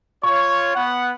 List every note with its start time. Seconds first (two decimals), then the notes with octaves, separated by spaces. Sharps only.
0.23 F4 C#5 C#6
0.75 B3 F#5